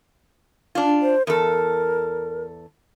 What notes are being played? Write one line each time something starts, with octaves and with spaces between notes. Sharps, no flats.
D4 F4
C5
E2 A4 A#4